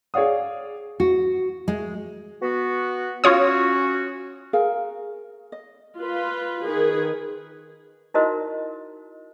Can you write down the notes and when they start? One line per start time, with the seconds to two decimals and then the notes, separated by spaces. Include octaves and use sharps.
0.14 G#4 C#5 D5 F5 D#6
1.00 F#4
1.68 G#3
2.41 B3 F#4
3.24 C#4 F4 F#4 C#5 D#6
4.53 G#4 A#4 F5
5.52 D#5
6.00 F4 B4
6.65 D#3 G#4 B4
8.14 D#4 E4 F#4 A#4 C5 D#5